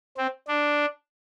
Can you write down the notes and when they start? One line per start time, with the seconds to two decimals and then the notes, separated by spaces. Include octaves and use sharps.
0.17 C4
0.48 D4